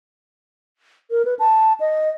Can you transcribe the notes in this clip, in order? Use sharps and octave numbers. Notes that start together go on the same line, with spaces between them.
A#4
B4
A5
D#5